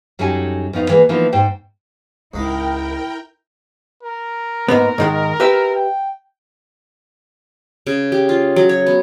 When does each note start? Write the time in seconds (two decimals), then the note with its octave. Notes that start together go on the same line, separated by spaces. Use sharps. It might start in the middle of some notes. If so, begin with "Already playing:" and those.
0.19 F#2 F#3 G3 D#4 A4 G#5
0.73 F2 B3 D#4 F5
0.89 E3 G#3 A#3 B3
1.09 E3 F3 A#3 B3 D#4
1.33 G#2 C5 G5
2.34 C#2 G#2 G#3 E4 A#4 G5
4.03 A#4
4.68 G#2 A#3 B3
4.98 G#2 D#3 G#3
5.40 G4 B4 E5
5.75 G5
7.87 C#3
8.12 G4
8.29 F4
8.56 F#3
8.69 C#5
8.86 B3